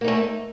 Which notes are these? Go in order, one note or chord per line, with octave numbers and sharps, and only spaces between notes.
A3 A#3 D#4